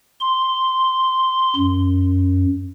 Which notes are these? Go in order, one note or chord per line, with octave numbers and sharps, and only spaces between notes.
C6
F#2